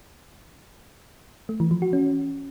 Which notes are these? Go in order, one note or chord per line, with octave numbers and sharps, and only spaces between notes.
A3
E3
F3
F#4
C#4